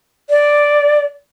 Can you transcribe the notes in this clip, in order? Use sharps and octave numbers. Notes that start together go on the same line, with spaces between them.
D5